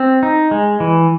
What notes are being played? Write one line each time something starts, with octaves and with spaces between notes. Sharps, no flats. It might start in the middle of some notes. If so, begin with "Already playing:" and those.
Already playing: C4
D#4
G#3
E3